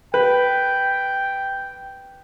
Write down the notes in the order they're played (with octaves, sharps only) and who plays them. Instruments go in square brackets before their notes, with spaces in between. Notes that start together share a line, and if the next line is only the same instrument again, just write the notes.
[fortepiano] B4 [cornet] G5